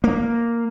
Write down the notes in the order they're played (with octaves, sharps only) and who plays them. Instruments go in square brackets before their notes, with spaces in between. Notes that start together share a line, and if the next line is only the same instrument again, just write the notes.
[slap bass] A#3